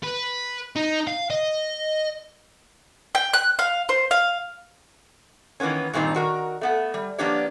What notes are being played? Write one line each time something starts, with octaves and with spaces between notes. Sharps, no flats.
B4
D#4
F5
D#5
G5
F#6
F5
C5
F5
D#3 E3 A#3 B3 C#4
G2 A#2 D#3 C4 D#4
D#3 F#4 A#4
A3 B3 F#5
G3
F3 A#3 B3 D4 G4 C#5